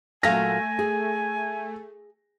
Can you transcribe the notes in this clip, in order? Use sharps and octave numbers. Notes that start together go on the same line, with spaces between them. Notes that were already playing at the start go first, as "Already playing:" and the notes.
A#2 F#3 A3 F5 G#5 A#6
G#4